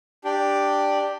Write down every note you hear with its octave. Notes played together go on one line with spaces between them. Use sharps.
D4 G4